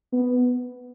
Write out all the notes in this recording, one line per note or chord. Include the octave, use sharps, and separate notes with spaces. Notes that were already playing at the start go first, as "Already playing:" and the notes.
B3